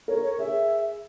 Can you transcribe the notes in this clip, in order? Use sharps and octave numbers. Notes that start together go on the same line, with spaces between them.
A#4 C#5
C#5
G#4 E5